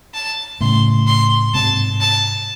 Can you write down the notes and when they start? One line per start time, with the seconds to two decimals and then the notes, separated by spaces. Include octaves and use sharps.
0.14 A5
0.61 A2 C#3 C6
1.07 C6
1.54 G#2 C3 A5
2.01 A5